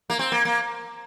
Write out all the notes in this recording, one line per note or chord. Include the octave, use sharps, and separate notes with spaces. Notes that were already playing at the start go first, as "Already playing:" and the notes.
A#3
C4
A#3
A#3